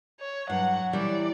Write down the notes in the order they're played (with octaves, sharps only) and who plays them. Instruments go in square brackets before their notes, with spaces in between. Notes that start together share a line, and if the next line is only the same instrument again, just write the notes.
[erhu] C#5
[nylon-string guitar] G2 [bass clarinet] F#3 [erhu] F#5
[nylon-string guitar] E3 G3 [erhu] D5